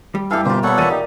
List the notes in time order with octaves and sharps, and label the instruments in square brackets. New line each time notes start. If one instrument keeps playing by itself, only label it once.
[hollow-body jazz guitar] G3
[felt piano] G2 E4 F6 [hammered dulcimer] E3 G4 [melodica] A4 F5
[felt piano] B2 [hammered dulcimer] A#3 F4 [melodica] G4 C5
[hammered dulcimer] A#2 B3 [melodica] A4 C#5 F#5
[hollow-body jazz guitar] E2 B3 [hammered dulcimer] A#2 [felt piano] A6 D#7
[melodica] D#4 [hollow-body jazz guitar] G4